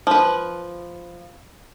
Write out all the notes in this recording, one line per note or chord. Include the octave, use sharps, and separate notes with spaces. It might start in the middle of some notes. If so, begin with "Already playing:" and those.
F3 B4